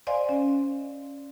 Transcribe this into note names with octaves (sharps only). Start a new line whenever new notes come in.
C5 D5 D#5 F5 G#5 C6
C#4